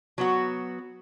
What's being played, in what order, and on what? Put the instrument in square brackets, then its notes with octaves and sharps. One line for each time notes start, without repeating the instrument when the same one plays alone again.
[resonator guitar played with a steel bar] F#3 B3 F#4